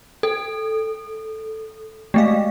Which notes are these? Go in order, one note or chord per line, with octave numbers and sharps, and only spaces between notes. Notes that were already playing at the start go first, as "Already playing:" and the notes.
A4
G#3 A3 F5